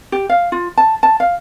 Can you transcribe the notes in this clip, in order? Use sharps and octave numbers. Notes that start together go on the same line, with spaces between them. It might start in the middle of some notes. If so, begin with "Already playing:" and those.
G4
F5
F4
A5
A5
F5